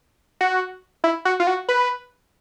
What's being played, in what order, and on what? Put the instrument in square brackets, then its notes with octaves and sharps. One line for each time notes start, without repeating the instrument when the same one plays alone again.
[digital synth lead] F#4
E4
F#4
F4
F#4
B4